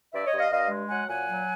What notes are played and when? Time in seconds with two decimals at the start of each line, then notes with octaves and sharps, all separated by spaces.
0.13 G2 D5 E5
0.25 C#5 D#5
0.32 G2
0.38 D#5 F5
0.51 G2 D#5 F5
0.70 G#3
0.89 F#3 F#5 G#5
1.08 A#2 F#5 G#5
1.27 F#3